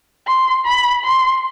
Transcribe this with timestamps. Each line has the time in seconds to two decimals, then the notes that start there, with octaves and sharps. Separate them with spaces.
0.26 C6
0.65 B5
1.04 C6